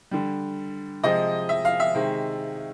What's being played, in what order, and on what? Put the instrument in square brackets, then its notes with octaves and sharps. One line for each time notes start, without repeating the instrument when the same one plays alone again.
[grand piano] D3 G3
C3 F3 G#3 D#5
E5
F5
E5
C3 D#3 G#3